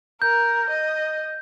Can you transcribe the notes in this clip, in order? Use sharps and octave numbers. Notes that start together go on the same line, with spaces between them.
A#4 G6
D#5